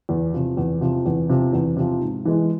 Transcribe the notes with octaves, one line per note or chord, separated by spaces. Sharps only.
E2
C3 F3
E2
C3 F3
E2
C3 F3
E2
C3 F3
G#2
E3 G#3